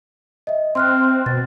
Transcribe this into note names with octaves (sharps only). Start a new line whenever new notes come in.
D#5 E5
C4 C6 F6 F#6
B2 A6